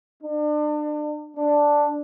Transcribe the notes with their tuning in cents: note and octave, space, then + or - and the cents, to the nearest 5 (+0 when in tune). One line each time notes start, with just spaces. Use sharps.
D4 +35
D4 +0